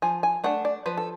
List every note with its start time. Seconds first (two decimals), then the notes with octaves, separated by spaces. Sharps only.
0.02 F3 G#5
0.23 G#5
0.44 A3 D4 F#5
0.65 D5
0.86 F3 B4
0.97 A4